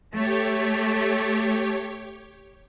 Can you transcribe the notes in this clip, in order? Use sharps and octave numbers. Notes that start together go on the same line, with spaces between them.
A3 G4 C#5